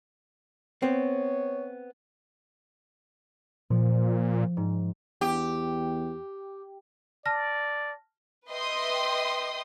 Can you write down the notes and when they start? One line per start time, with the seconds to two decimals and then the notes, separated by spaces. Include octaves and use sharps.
0.82 B3 C4 C#5
3.70 A#2 F3
4.57 G#2
5.21 E2 G4
7.26 D5 A5 F6 A#6
8.50 B4 D#5 E5 G5 C6 D#6